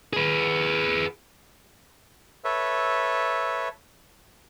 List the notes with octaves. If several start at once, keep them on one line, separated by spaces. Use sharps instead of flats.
G#4 B4
A4 B4 C#5 E5